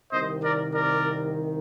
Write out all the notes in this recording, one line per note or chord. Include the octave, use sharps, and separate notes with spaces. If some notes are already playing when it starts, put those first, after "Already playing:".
C2 C3 D#3 C5 D#5
A#4 D5
A#4 D5